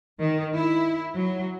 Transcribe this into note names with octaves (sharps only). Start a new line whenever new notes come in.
D#3
E4
F#3